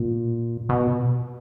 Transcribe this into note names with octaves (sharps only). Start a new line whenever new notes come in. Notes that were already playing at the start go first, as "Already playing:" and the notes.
Already playing: A#2
B2